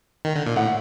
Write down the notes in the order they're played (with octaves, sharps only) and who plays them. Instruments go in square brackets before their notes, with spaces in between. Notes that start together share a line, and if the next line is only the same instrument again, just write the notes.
[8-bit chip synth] D#3
D3
A#2
[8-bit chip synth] A2 [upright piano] F#5